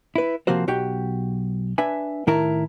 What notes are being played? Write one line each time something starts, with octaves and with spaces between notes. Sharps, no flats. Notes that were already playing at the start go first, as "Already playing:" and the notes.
E4 B4
C3 F3 A#3 C4 F#4 C5
B1 F#4 G4 G5
D4 B4 E5 G#5
A2 D#3 E4 A#4 A5 A#5